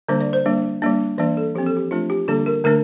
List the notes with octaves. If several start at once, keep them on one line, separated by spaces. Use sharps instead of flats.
D3 G3 A#3 D4 C5
D5
C5
G3 A#3 D4
G3 A#3 D4
E3 A#3 D4 D5
A4
F3 C4 G4
A4
G4
F3 A3 D4 F4
G4
D3 G3 A#3 D4 A4
A#4
D3 A3 D4 A#4